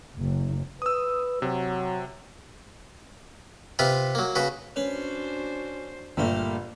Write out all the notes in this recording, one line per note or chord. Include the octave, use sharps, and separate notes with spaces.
F#1
B4 D#6 E6
C3 F#3
C3 F4 B4 F5
F#3 A#3
C#3 F#4 B4
C#4 D4 F#4 B4 C5
G1 A#2 G3 A3 A#4